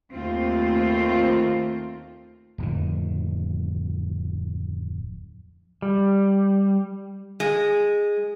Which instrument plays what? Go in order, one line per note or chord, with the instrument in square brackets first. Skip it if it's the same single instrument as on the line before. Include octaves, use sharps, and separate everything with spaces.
[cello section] D#2 A3 C4 F4
[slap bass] D1 F2 D#3
[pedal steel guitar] G3
[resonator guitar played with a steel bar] G#3